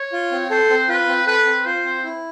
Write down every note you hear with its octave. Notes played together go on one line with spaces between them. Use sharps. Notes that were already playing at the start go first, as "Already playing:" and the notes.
Already playing: C#5
F4
C4
A4 C5
C4
F4 B4
C4
A4 B4
C4
F4 C5
C4
E4